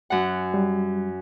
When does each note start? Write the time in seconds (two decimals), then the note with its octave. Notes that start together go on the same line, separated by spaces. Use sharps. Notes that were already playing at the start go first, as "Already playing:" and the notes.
0.10 F#2 F#5
0.54 G3